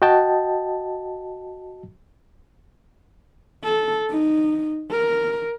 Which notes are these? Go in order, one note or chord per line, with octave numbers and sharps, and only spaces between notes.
F#4 D#5 G5 A5
A4
D#4
A#4